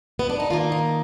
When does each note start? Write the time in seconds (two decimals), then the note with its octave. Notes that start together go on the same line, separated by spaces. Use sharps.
0.19 B3
0.30 D4
0.40 D#4
0.50 D#3 F4
0.53 A#3
0.72 D#4